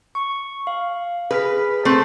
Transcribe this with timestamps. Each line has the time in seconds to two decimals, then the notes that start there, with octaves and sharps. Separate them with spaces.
0.15 C#6
0.67 F5
1.31 G#4 B4 F6 B6
1.85 A3 C4